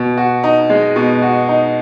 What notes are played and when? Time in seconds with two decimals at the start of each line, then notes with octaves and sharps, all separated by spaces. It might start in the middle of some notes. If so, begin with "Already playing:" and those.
Already playing: B2
0.17 F#4
0.43 D#4
0.70 G#3
0.96 B2
1.22 F#4
1.48 D#4